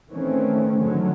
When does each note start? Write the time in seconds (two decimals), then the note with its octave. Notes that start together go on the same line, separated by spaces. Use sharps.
0.10 D#3 E3 A3 C4 C#4
0.78 G#2 D3 D#3 F#3